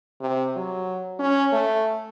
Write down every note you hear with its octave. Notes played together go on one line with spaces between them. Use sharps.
C3
F#3
C#4
A3